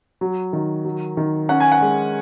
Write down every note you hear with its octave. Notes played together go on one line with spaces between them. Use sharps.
F#3
D#3
F#3
D#3
C#4 F#5
G#5
F#5
G#3